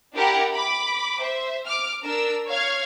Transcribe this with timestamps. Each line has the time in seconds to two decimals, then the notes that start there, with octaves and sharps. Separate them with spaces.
0.14 D4 E4 G4 A#4 F#5 A#5
0.53 B5 D6
1.18 C5 E5
1.66 D6 F6
2.03 D4 A#4 E6
2.48 C#5 F5 F6 G#6